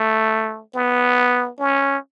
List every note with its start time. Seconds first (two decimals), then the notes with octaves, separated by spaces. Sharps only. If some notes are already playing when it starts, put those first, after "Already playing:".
Already playing: A3
0.75 B3
1.59 C#4